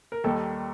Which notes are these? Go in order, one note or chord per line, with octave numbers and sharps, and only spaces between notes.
A#4
D#2 D#3 G3 A4